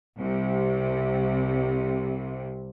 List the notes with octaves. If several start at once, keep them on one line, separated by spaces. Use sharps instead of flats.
C2 C3